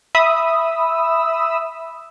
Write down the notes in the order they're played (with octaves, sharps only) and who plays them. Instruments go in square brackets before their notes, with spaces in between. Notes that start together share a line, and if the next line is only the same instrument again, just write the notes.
[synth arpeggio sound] E5 B5 D#6 E6